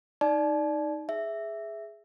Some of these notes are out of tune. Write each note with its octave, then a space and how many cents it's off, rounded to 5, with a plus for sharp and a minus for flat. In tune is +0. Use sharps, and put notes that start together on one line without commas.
D#4 +0 D5 +0 A5 -35
G#4 +0 E5 +0